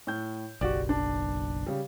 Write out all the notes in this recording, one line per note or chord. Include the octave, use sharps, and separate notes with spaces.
A2 G6
F#1 B1 F#4 G4 D5
D4
C#3 G3